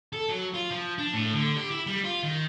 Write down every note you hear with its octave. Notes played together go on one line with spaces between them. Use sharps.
A4
F#3
F4
F3
D4
A2
D3
G4
E4
G3
F4
D#3